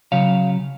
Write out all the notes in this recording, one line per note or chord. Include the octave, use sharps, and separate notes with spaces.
C#3 F#3 C#5 F5